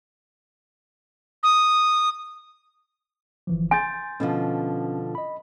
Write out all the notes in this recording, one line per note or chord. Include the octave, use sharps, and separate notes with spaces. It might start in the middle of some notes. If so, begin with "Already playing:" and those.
D#6
G1 E3 F3
G#5 C6 G6 A6
B2 D3 F3 C#4
D#5 B5